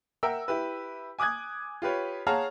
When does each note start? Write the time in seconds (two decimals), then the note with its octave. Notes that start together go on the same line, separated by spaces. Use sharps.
0.23 A#4 E5 F#5 G5 E6
0.48 E4 G4 B4
1.19 G#5 D6 D#6 F#6 G#6
1.82 F4 G4 B4 C#5
2.27 G#4 C#5 F5 F#5 A5 A#5